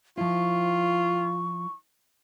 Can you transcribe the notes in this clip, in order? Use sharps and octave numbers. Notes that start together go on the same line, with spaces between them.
F3 E4 F4 C#6